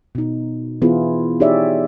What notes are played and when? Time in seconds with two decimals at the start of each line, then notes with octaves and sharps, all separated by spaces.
0.15 B2 D#4
0.82 E3 B3 E4 F4 G#4
1.40 D#4 G4 G#4 C#5 D5 E5